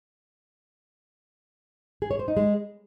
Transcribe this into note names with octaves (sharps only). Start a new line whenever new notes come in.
G#4
C#5
C5
D#4
G#3